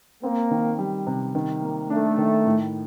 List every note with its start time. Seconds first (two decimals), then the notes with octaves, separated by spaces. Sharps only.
0.23 A#3 C4
0.51 D#3
0.79 G3
1.07 C3
1.35 D#3
1.62 A#3
1.90 A3 D4
2.18 D#3
2.46 A2